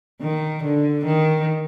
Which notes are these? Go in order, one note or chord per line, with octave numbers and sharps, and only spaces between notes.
D#3
D3
D#3